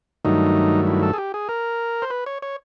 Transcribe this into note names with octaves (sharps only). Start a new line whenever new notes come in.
G2 D#3 F#3 A3 D#4
E4
A4
G#4
G4
G#4
A#4
C5
B4
C#5
C#5